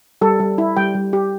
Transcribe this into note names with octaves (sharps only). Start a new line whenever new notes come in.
G3 A4
G3
E4
G3 G5
G3
G4